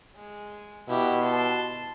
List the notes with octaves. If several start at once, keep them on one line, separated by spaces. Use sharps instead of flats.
G#3
B2 E4 G4
A5 C6